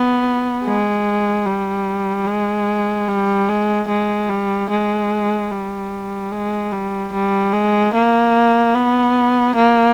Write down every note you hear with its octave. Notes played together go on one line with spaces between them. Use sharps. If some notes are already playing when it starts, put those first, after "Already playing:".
Already playing: B3
G#3
G3
G#3
G3
G#3
G#3
G3
G#3
G3
G#3
G3
G3
G#3
A#3
B3
A#3